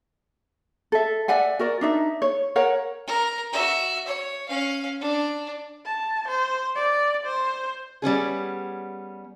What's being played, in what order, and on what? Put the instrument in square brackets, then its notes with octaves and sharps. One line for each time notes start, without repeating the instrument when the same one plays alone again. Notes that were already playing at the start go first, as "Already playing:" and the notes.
[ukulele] A4 E5
D5 E5 F#5 G#5
F#4 A#4 D5
D4 D#4 E5
C#5
A#4 C#5 F#5
[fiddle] A#4
F#4 E5
C#5
C#4 F5
D4
[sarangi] A5
C5
D5
C5
[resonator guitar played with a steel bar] G3 B3 C#4 G#4